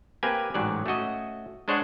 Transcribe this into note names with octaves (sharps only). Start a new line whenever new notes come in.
A#3 C4 G4 B4 G#5
A1 G#2 F#3 D5
A3 C#4 F#4 D#5
G#3 D4 C5 C#5 D#5 F#5